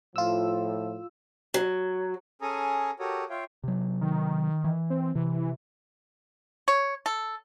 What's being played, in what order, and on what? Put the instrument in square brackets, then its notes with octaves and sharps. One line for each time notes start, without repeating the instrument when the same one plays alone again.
[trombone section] A2 F3 [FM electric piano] F4 E6
[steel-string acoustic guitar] F#3
[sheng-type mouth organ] C#4 G#4 A4 G#5 A#5 D#6
F#4 G4 A4 A#4 C#5 D#6
F4 C#5 E5 F5 G5
[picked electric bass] C3 F#3
[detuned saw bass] D#3
[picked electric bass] E3
[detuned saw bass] C4
[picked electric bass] C3 [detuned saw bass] E3
[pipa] C#5
A4